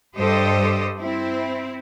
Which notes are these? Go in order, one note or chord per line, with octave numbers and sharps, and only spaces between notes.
G2 G3 G4 A4 C5 D#5
C4 E4